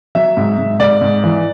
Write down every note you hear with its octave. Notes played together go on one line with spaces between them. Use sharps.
F#3 E5
G#2
G#2
G#2 D5
G#2
E3